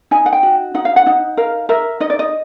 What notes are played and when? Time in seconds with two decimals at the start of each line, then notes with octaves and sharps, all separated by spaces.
0.11 D#4 G#5
0.26 F#5
0.32 G5
0.43 F#4
0.74 D#4 F#5
0.85 F5
0.96 F#5
1.06 D#4
1.37 A#4 F5
1.69 A#4 E5
2.00 D#4 D#5
2.10 D5
2.19 D#5